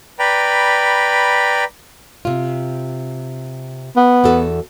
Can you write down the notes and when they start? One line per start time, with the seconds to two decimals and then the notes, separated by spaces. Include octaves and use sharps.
0.19 B4 D5 G5 A#5 B5
2.25 C3 F4
3.97 B3
4.24 E2 F#4 A4